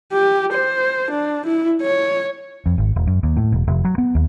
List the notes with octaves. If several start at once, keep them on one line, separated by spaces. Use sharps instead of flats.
G4
C5
D4
E4
C#5
F2
G#1
E1
F#2
D#2
A2
E1
F1
F#3
B3
D#2